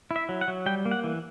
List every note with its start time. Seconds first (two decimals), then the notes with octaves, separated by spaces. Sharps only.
0.11 E4
0.16 E5
0.29 F#3
0.41 F#5
0.48 F#3
0.66 G3 G5
0.85 A#3
0.91 F#5
1.04 E3